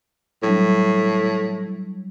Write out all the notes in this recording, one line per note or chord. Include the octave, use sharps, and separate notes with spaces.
A2 F#3 G3 D4